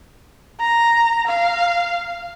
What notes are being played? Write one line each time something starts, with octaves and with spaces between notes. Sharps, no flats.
A#5
F5